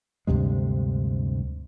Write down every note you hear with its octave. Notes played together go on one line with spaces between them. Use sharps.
D2 G2 C3 G#3